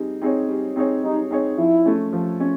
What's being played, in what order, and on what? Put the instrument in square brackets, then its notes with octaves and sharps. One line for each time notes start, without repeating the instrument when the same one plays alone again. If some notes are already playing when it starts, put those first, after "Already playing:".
Already playing: [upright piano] G3 C4 D#4 G#4
C4 D#4 G#4 C#5
G3
C4 D#4 G#4 C#5
[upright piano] G3 [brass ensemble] D#4
[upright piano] C4 D#4 G#4 C#5
[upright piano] F3 [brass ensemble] E4
[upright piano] A3 C#4
F3
C#4